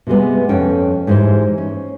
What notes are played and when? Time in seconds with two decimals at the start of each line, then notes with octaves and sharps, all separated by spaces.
0.07 C3 G3 G#3 B3
0.49 F2 C#4 G5
1.07 G#2 E3 G#3 G4 C5
1.58 C#4